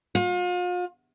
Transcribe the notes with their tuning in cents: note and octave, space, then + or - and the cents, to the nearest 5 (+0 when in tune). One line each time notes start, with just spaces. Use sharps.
F4 +40